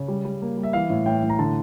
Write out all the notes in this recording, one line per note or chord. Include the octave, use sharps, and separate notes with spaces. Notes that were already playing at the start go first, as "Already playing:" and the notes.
Already playing: C#3
G3
G3
A#3
G3
E5
E3 F5
A2
A2 G5
A2
A#5
D3 A5